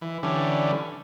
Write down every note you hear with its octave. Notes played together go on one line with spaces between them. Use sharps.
E3
D3 E3 G3 C#4